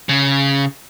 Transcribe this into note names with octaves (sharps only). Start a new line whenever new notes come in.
C#3